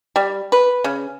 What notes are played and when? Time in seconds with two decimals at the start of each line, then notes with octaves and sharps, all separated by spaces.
0.16 G3
0.52 B4
0.84 C#3